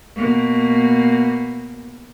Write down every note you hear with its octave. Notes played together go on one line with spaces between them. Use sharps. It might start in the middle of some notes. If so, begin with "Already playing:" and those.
B2 A#3